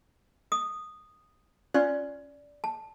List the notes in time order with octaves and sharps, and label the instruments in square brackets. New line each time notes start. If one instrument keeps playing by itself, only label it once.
[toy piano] D#6
[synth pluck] C#4 F4 F#6 [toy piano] D5
[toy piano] A5